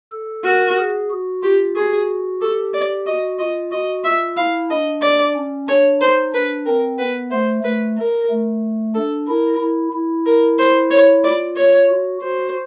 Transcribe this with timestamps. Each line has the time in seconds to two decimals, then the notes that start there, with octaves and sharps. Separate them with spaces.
0.12 A4
0.44 F#4 A#4
0.78 G#4
1.10 F#4
1.43 F4 G4
1.76 F#4 G#4
2.42 G4 A4
2.74 D5
3.06 F#4 D#5
3.39 F4 D#5
3.72 F#4 D#5
4.04 F4 E5
4.37 E4 F5
4.70 D4 D#5
5.02 D5
5.35 C#4
5.68 D4 C#5
6.00 D#4 C5
6.33 D4 B4
6.66 C4 A#4
6.98 B3 B4
7.31 A3 C5
7.64 A3 B4
7.97 A#4
8.30 A3
8.95 D4 A4
9.28 E4 A#4
9.60 E4
9.93 E4
10.26 A#4
10.59 C5
10.91 C#5
11.24 F4 D5
11.56 C#5
11.89 F#4
12.22 F#4 C5